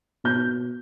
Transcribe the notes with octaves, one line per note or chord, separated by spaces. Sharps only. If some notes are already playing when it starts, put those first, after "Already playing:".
B2 G6